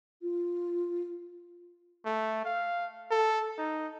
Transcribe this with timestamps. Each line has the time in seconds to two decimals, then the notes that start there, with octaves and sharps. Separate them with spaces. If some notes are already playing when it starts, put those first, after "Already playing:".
0.22 F4
2.05 A3
2.45 F5
3.11 A4
3.58 D#4